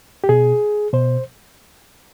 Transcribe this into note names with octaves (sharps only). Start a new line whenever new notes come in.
G4
B2 G#4
B2 C5